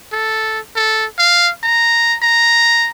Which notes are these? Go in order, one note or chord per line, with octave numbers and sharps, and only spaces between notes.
A4
A4
F5
A#5
A#5